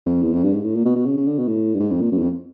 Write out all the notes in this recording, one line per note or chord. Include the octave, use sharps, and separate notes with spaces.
F2
E2
F2
G2
G#2
A2
A#2
B2
B2
C#3
C#3
D3
B2
A2
G2
G#2
F2
A#2
F#2
E2
F2